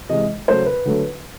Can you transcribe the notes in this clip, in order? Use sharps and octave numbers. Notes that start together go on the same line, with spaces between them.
C3 E3 G#3 D#5
C#3 F#3 A3 C5
B4
D3 F#3 A3